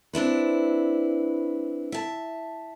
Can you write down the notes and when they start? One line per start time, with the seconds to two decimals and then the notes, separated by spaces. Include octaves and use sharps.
0.13 C4 D4 E4 B4
1.92 E5 A5